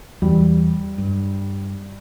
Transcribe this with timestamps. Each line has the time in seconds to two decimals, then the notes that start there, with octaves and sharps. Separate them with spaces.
0.22 E2 E3 G3
0.98 G2